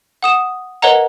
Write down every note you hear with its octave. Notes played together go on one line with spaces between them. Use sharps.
F#5 D#6 E7
A#4 B4 C#5 D#5 F#5 A#5